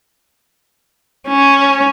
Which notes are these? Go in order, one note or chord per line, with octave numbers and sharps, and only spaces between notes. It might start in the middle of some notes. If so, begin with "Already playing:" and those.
C#4